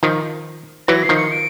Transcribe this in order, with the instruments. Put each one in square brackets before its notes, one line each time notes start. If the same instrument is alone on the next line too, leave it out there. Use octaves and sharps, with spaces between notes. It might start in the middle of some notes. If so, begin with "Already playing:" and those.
[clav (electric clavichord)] D#3 F3
[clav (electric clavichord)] E3 F#3 [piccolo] A#6
[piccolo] C7
[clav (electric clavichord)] D#3 F3
[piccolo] C#7
D7